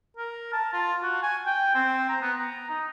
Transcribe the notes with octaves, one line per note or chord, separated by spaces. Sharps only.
A#4
A5
F4
F#4
G#5
G5
C4
A#5
B3
A#5
D#4